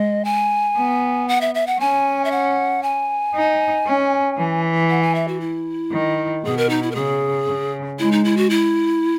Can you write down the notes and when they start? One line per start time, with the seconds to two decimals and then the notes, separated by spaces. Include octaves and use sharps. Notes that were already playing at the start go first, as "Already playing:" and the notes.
Already playing: G#3 D#5
0.25 G#5
0.77 B3
1.28 F#5
1.41 E5
1.55 E5
1.67 F#5
1.79 C#4 G#5
2.25 E5
2.31 F#5
2.83 G#5
3.34 D#4
3.87 C#4
4.38 E3
4.90 F#5
5.02 G#5
5.15 E5
5.28 F#4
5.40 E4
5.93 D#3
6.44 B2 G#4
6.57 A#4
6.69 D#4
6.83 E4
6.91 A#4
6.95 C#3 G#4
7.47 C#3
7.99 G#3 E4
8.12 D#4
8.24 E4
8.37 F#4
8.50 E4